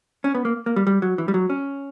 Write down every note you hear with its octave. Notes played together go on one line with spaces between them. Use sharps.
C#4
B3
A#3
A#3
G3
G3
F#3
E3
G3
F#3
C#4